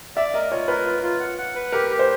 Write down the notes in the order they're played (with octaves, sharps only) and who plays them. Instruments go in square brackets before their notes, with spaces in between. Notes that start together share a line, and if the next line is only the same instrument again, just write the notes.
[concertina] D5 [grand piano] E5
[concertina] A#4 [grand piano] D#5
[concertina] F4 [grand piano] C#5
[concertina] A#4 [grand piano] B4
[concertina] F4
F4
F#5
F#5
B4
[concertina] G4 [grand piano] A#4
[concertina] G4
[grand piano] C5